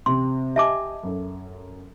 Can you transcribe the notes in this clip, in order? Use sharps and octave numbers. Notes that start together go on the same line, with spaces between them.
C3 C4 C6
G4 D#5 E5 G#5 A5 D6
F#2 A4